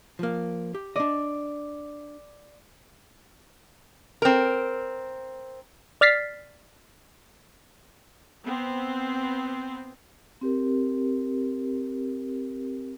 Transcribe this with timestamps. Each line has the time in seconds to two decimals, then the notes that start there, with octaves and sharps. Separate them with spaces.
0.19 F3 A#3
0.75 G4
0.96 D4 D5 D#5
4.22 C4 A#4
6.01 D5 F6 A6 B6 C7
8.46 B3 C4
10.41 C4 G4 A#4